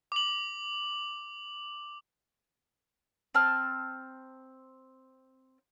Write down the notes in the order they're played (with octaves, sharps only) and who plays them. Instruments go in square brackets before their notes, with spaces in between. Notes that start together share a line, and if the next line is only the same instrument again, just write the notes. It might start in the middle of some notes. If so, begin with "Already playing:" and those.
[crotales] D6 F#7
[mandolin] C4 A5 F6